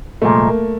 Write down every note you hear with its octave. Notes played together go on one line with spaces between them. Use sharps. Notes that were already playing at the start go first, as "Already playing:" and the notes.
C2 A#2 F3 G#3 A3
A#3